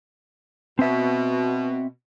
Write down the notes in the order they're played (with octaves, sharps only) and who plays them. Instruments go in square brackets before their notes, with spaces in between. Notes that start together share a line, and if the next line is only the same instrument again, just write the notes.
[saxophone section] B2 [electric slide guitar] C4 E5